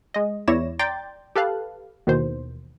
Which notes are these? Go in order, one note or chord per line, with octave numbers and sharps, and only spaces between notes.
G#3 D#5
E2 E4 C#5 D5 A#6 E7
D5 G5 A#5 C6 G6 A6
G4 A4 B4 F5 A5 F#6
D#2 B2 D#3 E3 C5